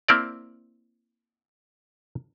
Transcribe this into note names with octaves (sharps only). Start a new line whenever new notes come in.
A#3 C4 E4 A#4 D5